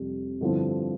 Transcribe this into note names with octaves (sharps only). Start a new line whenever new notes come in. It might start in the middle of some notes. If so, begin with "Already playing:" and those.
Already playing: F2 C3 G3
G2 D3 F3 C4 E4